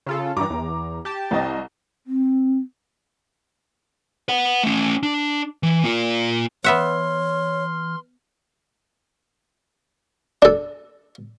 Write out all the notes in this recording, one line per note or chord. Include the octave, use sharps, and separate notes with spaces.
C#3 F4 A4
G2 E3 A#5 D6
E2
G4 A5
C2 C4 D#5
C4
B4 F#5
A3 C#4
D4
E3
A#3 F4
E3 B3 C#5 E5 F#5 C6 F6
D4 A4